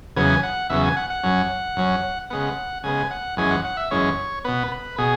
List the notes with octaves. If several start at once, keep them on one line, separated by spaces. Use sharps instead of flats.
E2 C#3 F#3 B3 G#5
F#5
E2 C#3 F#3 B3 E5
G#5
F#5
F#5
F#2 F#3 C#4
F#2 F#3 C#4
C#3 G#3 B3 F#5
C#3 G#3 B3 G#5
F#5
F#2 E3 G#3 C#4 G#5
F#5
F#5
E5
F#2 E3 G#3 C#4 C#5
B2 B3 B4
B4
B2 G#4